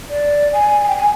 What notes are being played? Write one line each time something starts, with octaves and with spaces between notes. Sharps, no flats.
D5
G#5
G#5
G5
G#5